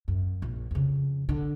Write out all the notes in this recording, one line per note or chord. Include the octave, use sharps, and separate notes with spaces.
F#2
A#1
F2 C#3
D3